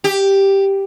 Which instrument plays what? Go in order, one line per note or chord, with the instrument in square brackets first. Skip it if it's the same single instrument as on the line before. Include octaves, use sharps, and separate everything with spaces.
[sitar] G4